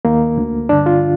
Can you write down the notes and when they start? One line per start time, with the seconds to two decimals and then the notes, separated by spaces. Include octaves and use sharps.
0.05 D#2 D#3 A#3
0.38 D2 D3
0.69 G2 D3 D4
0.86 F4